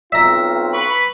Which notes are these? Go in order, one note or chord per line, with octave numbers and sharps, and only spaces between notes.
B1 C4 F4 E5 A#5
B4 B5 C#6